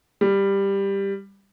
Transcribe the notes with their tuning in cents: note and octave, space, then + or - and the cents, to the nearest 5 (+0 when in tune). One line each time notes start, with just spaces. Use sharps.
G3 +10